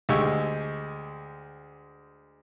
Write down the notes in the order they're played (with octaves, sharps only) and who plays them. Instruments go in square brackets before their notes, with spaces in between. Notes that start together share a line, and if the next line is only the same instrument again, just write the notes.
[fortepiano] D2 G#3 G4 C#6 E6